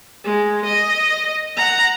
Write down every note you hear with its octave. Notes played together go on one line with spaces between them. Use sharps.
G#3
D#5
F#5 A#5